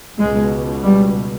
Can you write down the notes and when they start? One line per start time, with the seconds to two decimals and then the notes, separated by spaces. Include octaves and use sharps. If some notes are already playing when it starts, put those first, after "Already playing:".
0.19 C#2 B2 G#3
0.84 G3